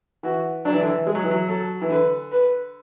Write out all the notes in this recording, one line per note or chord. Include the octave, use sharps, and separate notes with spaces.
E3 F#4
F#3 D4
E3
D3
E3
G#3 G#4
F#3
E3
F#3
F#3 A4
E3
D3 B4
B4